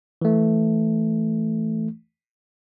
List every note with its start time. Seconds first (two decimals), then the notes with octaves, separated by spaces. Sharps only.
0.22 E3 A3